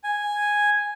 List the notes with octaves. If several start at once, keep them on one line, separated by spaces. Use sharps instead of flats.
G#5